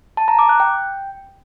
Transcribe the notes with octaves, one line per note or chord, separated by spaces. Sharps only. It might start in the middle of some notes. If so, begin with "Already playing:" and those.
A5
A#5
D6
F#6
G5